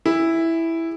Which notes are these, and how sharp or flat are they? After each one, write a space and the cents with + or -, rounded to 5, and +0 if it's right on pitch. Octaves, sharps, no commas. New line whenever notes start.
E4 +0 G#4 -40